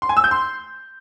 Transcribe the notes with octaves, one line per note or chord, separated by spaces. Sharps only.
C6
G#5
E6
G6
C6